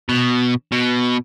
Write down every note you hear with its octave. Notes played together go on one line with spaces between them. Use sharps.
B2
B2